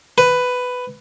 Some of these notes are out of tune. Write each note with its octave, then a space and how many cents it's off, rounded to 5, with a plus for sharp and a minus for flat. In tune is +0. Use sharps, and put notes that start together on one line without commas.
B4 +10